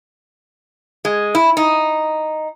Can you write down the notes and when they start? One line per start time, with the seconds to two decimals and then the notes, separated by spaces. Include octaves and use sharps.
1.05 G#3
1.35 E4
1.57 D#4